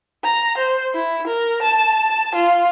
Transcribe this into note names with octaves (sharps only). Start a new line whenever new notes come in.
A#5
C5
E4
A#4
A5
A5
F4